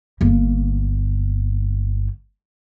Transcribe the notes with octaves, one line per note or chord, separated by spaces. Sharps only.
G1 A#3